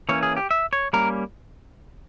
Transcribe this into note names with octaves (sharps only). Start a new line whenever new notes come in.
E3 A#3 C#4 C#5
G#4
G4
E5
C#5
G3 A#3 C#4 A#4